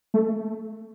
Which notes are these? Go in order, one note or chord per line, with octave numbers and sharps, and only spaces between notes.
A3